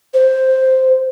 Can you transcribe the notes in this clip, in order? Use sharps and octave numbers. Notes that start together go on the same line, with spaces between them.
C5